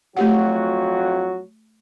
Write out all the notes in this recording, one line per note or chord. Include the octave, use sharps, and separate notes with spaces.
F2 F#3 A3 F#4 G4 F#5